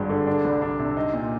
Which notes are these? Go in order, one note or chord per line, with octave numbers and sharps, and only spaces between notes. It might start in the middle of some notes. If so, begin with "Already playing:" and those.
Already playing: G#1 G2 G#3
D3
D4
C2
D4
C3
D#4
A#2